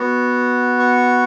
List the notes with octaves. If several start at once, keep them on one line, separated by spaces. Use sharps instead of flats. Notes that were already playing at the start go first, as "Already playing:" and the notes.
Already playing: B3 F#4
C#6